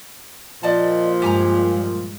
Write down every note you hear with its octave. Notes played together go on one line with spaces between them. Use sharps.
A#2 F3 D5 D#5 A5
G2 G#3 G4 G#5 A#5